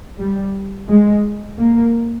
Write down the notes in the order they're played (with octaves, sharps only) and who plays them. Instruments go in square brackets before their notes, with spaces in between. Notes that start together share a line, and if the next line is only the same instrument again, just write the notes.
[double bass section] G3
G#3
A#3